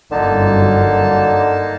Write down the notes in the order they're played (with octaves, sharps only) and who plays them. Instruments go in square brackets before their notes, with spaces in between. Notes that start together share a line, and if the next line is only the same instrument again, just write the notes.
[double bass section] G1 F#2 F#3 [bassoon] D3 [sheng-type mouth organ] A#3 D#4 A5